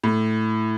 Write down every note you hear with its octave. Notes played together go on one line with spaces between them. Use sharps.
A2